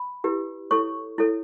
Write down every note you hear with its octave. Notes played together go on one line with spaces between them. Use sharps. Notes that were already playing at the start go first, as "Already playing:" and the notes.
Already playing: B5
E4 G4 B4
E4 A4 C#5 C#6
E4 A4 C#5